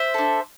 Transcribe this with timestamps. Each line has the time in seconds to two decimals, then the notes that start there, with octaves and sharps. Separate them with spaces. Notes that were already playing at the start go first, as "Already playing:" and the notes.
Already playing: C5 E5
0.14 D4 A4